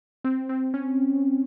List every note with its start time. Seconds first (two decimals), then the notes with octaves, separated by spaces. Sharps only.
0.24 C4
0.49 C4
0.74 C#4